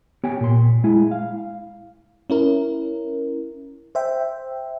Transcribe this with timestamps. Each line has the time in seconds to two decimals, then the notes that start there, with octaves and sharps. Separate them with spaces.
0.24 B3 G4 C#5 G5 G#5
0.41 A#2 C6
0.84 G#3 E4 G#5
1.11 F5
2.30 C#4 E4 A#4
3.95 C5 E5 G5